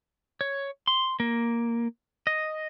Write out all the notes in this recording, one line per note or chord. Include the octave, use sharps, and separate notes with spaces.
C#5
C6
A#3
D#5